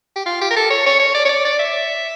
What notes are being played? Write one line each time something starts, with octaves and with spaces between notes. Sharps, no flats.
G4
F4
G4
A#4
A4
C#5
C#5
C#5
D5
C#5
D5
D5
E5